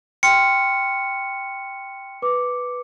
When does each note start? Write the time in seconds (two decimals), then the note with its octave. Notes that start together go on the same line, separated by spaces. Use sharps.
0.23 G5 C6 F6 C#7
2.22 B4 D6